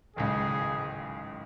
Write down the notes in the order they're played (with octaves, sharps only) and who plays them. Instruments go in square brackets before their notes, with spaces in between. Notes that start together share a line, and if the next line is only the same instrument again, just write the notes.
[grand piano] D1 G#1 C#2 [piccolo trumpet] G#4